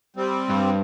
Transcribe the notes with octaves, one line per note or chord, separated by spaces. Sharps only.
G3 C4
G2